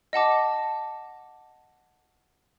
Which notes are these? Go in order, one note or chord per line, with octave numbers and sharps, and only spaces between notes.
D#5 F#5 A5 D6